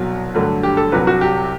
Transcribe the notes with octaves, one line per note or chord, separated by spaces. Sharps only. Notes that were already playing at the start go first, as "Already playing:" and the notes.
Already playing: C2 B2 F#3
G2 D3 F#3 A3
G4
A4
C2 C3 F#3 B4
F#4
G4